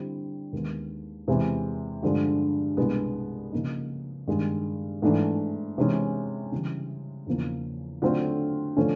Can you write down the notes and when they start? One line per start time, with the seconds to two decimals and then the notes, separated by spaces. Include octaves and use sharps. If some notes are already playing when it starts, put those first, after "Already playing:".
Already playing: D3 G3 C4 E4
0.52 D#2 D#3 G#3 B3
1.28 E2 C3 E3 G#3
2.03 G2 D3 F3 G#3
2.77 C2 B2 G#3 B3 D4
3.52 C#3 F3 A#3 D#4
4.28 G2 D#3 G#3
5.02 G#2 E3 A3 D4
5.78 C3 E3 G#3 C#4
6.52 C#3 E3 G3
7.27 E2 C#3 F3 A#3
8.02 D3 F#3 A3 C4 F4
8.77 D3 F3 A3 C#4